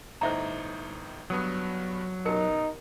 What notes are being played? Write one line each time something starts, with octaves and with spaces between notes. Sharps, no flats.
G1 A2 D#4 C5 E5 A#5
G2 F#3 B3 D#6
F#2 B2 D#4 G4 A#4 C#7